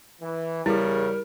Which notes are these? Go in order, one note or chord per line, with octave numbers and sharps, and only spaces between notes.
E3
E2 C#3 G3 E4 G#4 A#4